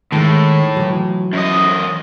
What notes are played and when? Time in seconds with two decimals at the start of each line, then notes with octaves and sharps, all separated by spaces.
0.12 A2 D#3 G#3
0.77 E3 F#3
1.33 F#2 D#5